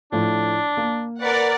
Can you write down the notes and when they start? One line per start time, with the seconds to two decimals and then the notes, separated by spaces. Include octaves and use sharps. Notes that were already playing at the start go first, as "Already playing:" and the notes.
0.12 A2 F3 D4
0.77 A#3
1.22 A#4 B4 D5 F#5